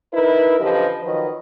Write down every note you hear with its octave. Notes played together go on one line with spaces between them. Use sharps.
D#4 E4 A#4 B4
F#2 D3 F3 G4 B4 D#5
D#3 F3 F#3 B4 D#5